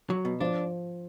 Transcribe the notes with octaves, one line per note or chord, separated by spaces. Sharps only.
F#3
B2
F3 D4